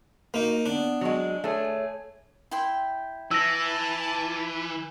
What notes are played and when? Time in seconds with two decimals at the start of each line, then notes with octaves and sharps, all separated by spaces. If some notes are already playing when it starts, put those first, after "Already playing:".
0.34 A#3 D#4 F#4
0.66 B3 D4
1.01 F#3 G#3
1.44 A3 G#4 C#5
2.51 E4 G5 C6
3.31 E3 A5 E6 A#6